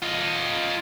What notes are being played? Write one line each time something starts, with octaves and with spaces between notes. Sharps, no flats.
F4 D#5